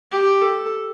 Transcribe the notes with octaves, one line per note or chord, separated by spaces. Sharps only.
G4
A4